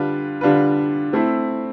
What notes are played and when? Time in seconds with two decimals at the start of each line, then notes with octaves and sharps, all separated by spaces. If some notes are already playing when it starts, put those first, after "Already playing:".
Already playing: D3 G3 D4 F4 B4
0.41 D3 G3 D4 F4 B4
1.13 A3 C4 E4